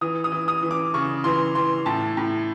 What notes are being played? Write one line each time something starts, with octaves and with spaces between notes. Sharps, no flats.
E3 D#6
D#6
E3
D#6
E3
D6
C#3 C#6
E3 C6
E3 C6
A2 A5
A2